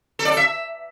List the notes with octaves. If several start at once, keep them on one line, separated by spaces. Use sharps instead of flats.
A4
D5
A4
E5